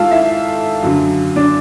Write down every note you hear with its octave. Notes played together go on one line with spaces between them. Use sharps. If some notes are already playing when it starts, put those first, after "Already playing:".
Already playing: G#2 D#3 F4 A4 F5 A5
E4 E5
F#2 D3 F#3
D4 D5